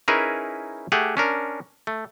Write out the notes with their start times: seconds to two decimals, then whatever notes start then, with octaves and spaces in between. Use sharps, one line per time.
0.08 C#4 D#4 E4 G#4 A#4 B4
0.92 A3 G4 G#4 F#5
1.17 C#4 D4 A#4
1.87 A3